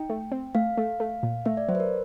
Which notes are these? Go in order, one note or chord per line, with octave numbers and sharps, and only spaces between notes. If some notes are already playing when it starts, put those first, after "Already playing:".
Already playing: D#4 G5
A3
C4
A3 F5
A3
A3
A#2
A3 E5
D5
F#3 C5
B4
A#4